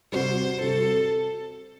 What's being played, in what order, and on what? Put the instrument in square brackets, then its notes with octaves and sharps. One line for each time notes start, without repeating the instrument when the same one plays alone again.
[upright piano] C3 G3 C4 F#4 [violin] C5
[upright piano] C3 G3 C4 F#4 [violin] A4